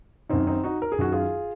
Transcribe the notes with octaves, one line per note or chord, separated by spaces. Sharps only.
F#2 D#3 C4 D#4
C4 D#4
D#4 F#4
A#4
G#4
F#2 D#3 F#4
F4 G#4